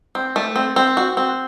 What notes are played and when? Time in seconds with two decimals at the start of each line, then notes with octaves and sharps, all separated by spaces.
0.15 C4
0.36 A3
0.56 C4
0.76 C4
0.97 F#4
1.17 C4